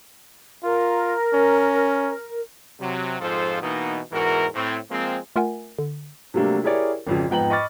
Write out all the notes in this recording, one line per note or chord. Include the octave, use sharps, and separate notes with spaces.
F4 A#4
C#4
C3 F#3
F2 G#2 F3 F4 A4 C5
B2 E3 A#3 B3 D#4
E2 G#2 E3 F#4 A#4
A2 C4
F3 G#3 A#3 C4
A3 F4 A#4 E5 F#5 G#5
D3
C3 F#3 G3 A3 A#3 D4
E4 G4 G#4 A#4 C#5 D5
G#1 F2 C#3
F2 G#2 B3 G5 A#5 F#7
D#5 B5 C#6 D6 F6 A6